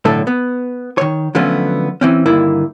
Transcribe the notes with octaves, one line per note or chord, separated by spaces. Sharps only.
B1 A2 D3 A3 A4
B3
D#3 C#5
D3 F3 F#3 A3 B3 C#4
E3 C4 C#4
G2 D3 D#3 A#3 E4